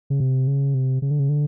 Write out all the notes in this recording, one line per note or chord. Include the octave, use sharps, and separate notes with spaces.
C#3
C3
C#3
C3
C#3
D3
C#3
D3